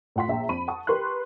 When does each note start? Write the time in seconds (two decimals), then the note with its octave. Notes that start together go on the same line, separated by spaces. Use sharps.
0.16 A2 F4 F#5 C6 B6
0.28 A#1 E5 G5 A#5
0.49 F2 B5 D#7
0.68 F#5 A5 C#6 D#6
0.87 G4 A#4 B4 C6 C#6 F#6